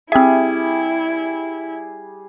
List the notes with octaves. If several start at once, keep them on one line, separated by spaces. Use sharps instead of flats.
G3 C4 E4 G#4 E5